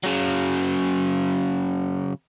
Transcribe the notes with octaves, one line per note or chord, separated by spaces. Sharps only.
C#3 F#3